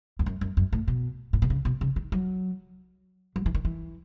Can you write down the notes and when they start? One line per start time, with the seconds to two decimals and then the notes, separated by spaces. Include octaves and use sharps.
0.19 E2
0.26 F#2
0.41 F#2
0.57 F#2
0.73 A2
0.88 B2
1.33 A2
1.42 B2
1.50 C#3
1.65 B2
1.81 C#3
1.96 D#3
2.12 F#3
3.36 F#3
3.46 E3
3.54 D#3
3.65 E3